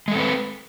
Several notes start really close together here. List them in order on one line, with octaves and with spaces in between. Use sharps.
G#3 A4 C4 B4